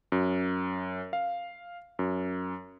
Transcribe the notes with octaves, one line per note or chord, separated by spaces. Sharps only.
F#2
F5
F#2